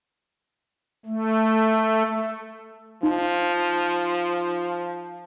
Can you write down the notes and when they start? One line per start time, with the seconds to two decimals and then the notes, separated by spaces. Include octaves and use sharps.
1.06 A3
3.03 F3 D#4